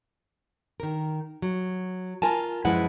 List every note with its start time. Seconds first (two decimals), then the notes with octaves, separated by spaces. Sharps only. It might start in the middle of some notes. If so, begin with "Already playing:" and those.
0.80 D#3 A#4
1.42 F#3
2.22 F4 A#4 G#5 A5
2.65 F#2 F3 G#3 E4 B4 F#5